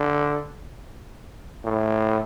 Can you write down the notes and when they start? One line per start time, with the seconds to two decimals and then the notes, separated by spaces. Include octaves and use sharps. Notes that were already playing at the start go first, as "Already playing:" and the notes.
Already playing: D3
1.64 A2